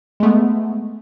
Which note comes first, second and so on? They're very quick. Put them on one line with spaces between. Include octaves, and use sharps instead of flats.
G#3 A3 B3